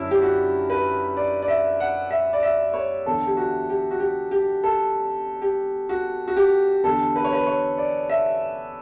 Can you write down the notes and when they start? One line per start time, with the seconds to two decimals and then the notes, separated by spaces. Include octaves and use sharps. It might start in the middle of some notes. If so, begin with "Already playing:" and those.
Already playing: F#2 D3 C#4 D4 E4
0.11 G4
0.22 F#4
0.70 B4
1.17 D5
1.42 D5
1.48 E5
1.80 F#5
2.11 E5
2.33 D5
2.43 E5
2.74 C#5
3.06 E2 D3 A4
3.27 G4
3.37 F#4
3.69 G4
3.91 F#4
4.00 G4
4.31 G4
4.64 A4
5.42 G4
5.89 F#4
6.28 F#4
6.37 G4
6.83 E2 D3 A4
7.16 B4
7.25 C#5
7.33 B4
7.47 C#5
7.78 D5
8.10 E5